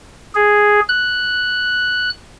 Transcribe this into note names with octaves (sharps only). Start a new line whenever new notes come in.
G#4
F#6